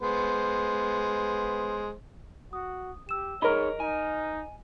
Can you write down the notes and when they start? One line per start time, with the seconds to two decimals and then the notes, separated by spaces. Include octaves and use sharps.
0.01 G#3 B3 C5
2.53 F#4 D#6
3.09 G4 E6 E7
3.42 D#4 G#4 A#4 C#5 D#5 A#5 B5
3.80 D#4 G#5